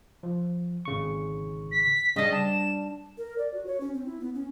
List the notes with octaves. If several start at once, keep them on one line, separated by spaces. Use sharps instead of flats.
F3
G#1 C#3 C#6
B6
C#3 G3 D4 D#5
A5 E7
A#4
D5
F#4
C#5
C#4
C4
E4
B3
C#4